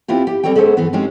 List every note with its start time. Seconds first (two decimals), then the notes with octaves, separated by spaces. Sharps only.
0.08 B3 C4 E4 F4 G4
0.27 G4
0.43 G3 C4 A4 C#5 G5
0.56 G#3 B3 C#4 A4 C5
0.77 F#2 E3 B3
0.93 G#3 C4 C#4 D#4 G4